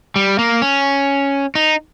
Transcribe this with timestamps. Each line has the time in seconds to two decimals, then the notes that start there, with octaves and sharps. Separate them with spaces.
0.16 G3
0.39 A#3
0.62 C#4
1.55 D#4